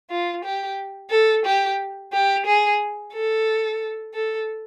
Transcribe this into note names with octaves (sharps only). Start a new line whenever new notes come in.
F4
G4
A4
G4
G4
G#4
A4
A4